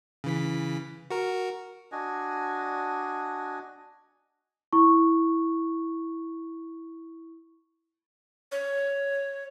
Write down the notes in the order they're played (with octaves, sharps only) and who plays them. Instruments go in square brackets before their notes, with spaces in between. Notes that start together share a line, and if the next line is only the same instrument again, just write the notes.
[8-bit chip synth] C#3 E3 B6
F#4 A#4
[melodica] D4 F#4 D#5 G#5
[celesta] E4 C#6
[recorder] C#5